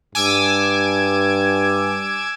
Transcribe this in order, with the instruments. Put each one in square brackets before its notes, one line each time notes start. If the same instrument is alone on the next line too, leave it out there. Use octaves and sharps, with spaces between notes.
[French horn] G2 [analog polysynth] G#5 D6 E6